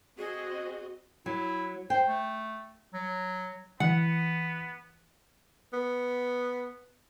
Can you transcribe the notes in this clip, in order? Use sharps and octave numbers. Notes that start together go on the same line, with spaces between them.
C4 F#4 G#4 D#5
F#3 E4
C5 G5
A3
F#3
E3 B3 F#5
B3